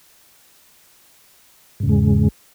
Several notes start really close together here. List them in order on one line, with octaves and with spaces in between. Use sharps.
G#2 C#3 E2 G#3